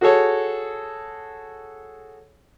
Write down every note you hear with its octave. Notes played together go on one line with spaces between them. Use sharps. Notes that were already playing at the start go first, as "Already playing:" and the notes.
F#4 G#4 A4 C#5